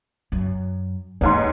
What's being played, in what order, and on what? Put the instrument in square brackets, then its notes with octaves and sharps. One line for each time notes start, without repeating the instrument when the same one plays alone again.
[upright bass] F#2
[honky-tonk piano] A1 G#2 C6 [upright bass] D#2